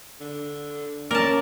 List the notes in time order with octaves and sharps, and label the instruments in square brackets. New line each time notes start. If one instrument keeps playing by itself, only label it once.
[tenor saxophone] D3
[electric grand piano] A#3 C#4 [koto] A#4 A5 [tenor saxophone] D5